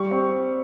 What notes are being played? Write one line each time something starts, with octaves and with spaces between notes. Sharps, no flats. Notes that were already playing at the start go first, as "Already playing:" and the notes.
Already playing: G3 C#6
C4